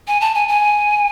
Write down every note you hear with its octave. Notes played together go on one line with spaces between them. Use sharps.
G#5
A5
G#5
G#5